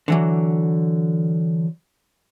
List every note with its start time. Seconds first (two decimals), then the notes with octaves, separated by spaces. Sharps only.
0.08 D3 E3 F#3